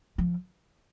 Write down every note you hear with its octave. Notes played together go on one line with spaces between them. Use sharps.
F3